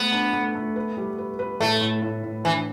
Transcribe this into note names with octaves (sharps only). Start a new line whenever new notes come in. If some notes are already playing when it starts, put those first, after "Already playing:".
Already playing: A3 B3
D4
A3
A3
B4
G3
B4
B4
A2 A3
A2
A2
A2
E3 D4